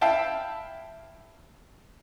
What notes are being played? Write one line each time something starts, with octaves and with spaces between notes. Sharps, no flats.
E4 E5 F5 G5 A5